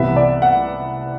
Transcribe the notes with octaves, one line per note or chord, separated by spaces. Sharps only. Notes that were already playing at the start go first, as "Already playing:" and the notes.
Already playing: C2 C3 E3 B3 E5
D5
F#5